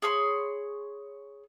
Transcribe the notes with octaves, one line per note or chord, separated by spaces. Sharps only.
G#4 C#5 B5 C6